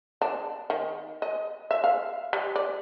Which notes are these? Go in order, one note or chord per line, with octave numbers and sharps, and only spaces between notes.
D4
D#3
D#5
E5
F5
G3
D5